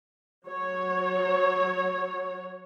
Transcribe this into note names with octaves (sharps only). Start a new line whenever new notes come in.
F#3 C#5